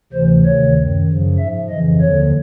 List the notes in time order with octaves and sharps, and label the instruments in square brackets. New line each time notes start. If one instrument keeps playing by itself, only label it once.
[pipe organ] D2 C3 E3 C5
D2 C3 D#3 C#5
F#2 D#3
F#2 C#3 F3
G#2 F3 E5
F2 C#3 E3 D#5
D#2 D3 F3 C#5